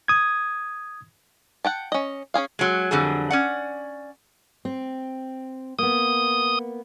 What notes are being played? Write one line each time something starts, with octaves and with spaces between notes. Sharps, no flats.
D#6 G#6
F#5 G5 A5
C#4 D#5
C#4 F4 G#4 F5
F#3 G#3
F2 D3 F#3 G3 G#4
C#4 D5 F#5
C4
A#3 B3 D#6